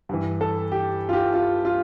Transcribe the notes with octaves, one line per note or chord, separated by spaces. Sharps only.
G2 E3
A4
G4
F4
G4
F4
F4